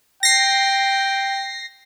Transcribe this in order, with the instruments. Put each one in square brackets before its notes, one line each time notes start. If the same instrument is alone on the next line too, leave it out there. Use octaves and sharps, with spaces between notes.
[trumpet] G5 [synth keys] A#6 C7